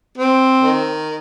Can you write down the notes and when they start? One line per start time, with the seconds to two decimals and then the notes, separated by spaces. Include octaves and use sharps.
0.16 C4
0.63 D#3